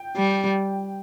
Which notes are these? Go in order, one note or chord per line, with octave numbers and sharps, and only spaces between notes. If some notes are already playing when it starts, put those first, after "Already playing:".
Already playing: G5
G3